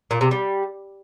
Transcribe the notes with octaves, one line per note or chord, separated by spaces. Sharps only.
A#2
C3
G3